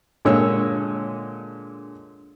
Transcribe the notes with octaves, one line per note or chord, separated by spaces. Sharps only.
A#2 D3 G#3 C#5 E6